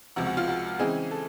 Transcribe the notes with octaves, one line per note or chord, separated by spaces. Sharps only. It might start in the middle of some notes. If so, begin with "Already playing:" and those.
C#2 C3 F3 F#4
F#4
F4
F#4
C#3 E3 G#3 C4 G#4
A4